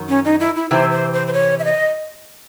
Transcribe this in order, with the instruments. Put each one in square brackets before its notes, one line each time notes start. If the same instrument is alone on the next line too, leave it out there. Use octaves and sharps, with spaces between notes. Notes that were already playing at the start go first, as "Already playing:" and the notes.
Already playing: [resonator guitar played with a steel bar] F#2 D#3 F#3
[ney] C#4
D#4
E4
E4
[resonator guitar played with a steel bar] C3 E3 C4 [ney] C5
[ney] C5
C5
C5
C#5
E5
D#5